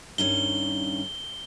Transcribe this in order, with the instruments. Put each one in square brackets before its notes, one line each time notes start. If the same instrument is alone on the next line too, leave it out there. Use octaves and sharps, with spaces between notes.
[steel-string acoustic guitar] G2 D#3 C#4 [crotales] G7